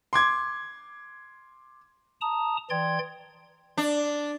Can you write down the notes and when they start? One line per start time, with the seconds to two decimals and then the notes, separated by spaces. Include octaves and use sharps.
0.13 C6 D6 G#6
2.21 A5 A#5 D#6
2.70 E3 D5 G5 C6 G#6
3.78 D4